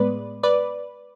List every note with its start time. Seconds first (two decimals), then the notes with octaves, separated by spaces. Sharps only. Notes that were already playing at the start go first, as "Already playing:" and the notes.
Already playing: A2 G#3 B3 B4 D5
0.43 B4 D5